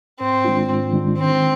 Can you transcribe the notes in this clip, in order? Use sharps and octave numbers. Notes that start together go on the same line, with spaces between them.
G#2 C4
D#3 G#3 D4 F4
G#2
D#3 G#3 D4 F4
D#3 C4